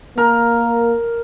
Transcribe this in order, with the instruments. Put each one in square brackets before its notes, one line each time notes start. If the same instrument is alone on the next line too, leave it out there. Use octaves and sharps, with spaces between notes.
[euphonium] A#3 [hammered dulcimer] A#4